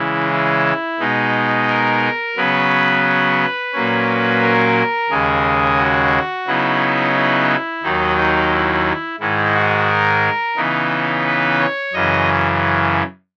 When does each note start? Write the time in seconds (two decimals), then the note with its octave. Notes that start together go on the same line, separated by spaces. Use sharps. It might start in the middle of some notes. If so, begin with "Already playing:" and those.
Already playing: C#3 E3 G#3 E4
0.32 E4
1.00 B2 G#3 D#4
1.68 A#4
2.37 C#3 F#3 B3 B4
3.73 A#2 F#3 A#3 C#4
4.42 A#4
5.10 D#2 C#3 G#3 G#4
5.78 F#4
6.47 C#3 F#3 B3 D#4 E4
7.15 E4
7.83 D#2 D#3 F#3 D#4
8.17 D#4
8.52 E4
9.20 G#2 D#3 G#3 E4
9.54 F#4
9.88 A#4
10.56 C#3 E3 B3 D#4
11.25 B4
11.59 C#5
11.93 F#2 C#3 E3 D#5